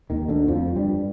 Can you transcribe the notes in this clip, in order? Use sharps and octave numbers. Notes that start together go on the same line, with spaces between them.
D#2 D#3
D2 D3
F2 F3
G2 G3